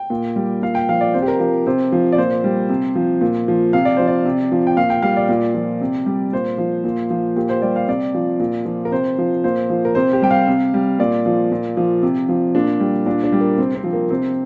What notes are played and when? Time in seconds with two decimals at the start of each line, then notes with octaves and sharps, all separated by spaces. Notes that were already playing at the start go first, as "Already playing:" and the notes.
Already playing: G5
0.10 A#2
0.36 G3
0.62 A#2 F5
0.75 G5
0.89 F3 F5
1.01 D5
1.14 C3 C5
1.22 G4
1.28 A#4
1.40 F3 A#4
1.67 C3 C5
1.92 F3
2.12 D5
2.18 A#2 C5
2.44 G3
2.69 C3
2.96 F3
3.21 A#2
3.48 F3
3.73 C3 F5
3.85 D5
3.97 F3 C5
4.07 D5
4.25 C3
4.52 F3
4.67 G5
4.77 A#2 F5
4.90 G5
5.02 G3 F5
5.17 D5
5.29 A#2
5.54 F3
5.81 C3
6.06 G3
6.33 A#2 C5
6.58 F3
6.84 A#2
7.10 F3
7.36 A#2 G4
7.49 C5
7.62 G3 D5
7.76 F5
7.88 C3 D5
8.15 F3
8.40 A#2
8.65 F3
8.85 A#4
8.92 C3 C5
9.18 F3
9.44 A#2 C5
9.70 F3
9.85 A#4
9.95 C3 C5
10.13 G4
10.22 G3 G5
10.31 F5
10.47 C3
10.74 G3
10.99 A#2 D5
11.26 F3
11.52 A#2
11.77 F3
12.02 C3
12.29 F3
12.55 A#2 D4
12.80 G3
13.06 A#2 D4
13.24 D4
13.32 G3
13.41 A#3
13.58 C3 C4
13.75 C4
13.84 F3
13.93 A#3
14.10 C3 C4